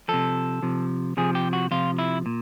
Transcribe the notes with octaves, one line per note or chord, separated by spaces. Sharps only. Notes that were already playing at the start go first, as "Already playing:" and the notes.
C3 F3 A4
C3 F3
C3 F3 G#4
G4
F#4
C3 F3 F4
E4
A#2